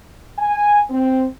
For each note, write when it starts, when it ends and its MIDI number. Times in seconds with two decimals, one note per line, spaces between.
0.39 0.81 80
0.90 1.25 60